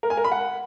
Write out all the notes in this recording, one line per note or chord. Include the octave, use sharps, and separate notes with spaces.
A#4
G#5
A#4
B5
F#5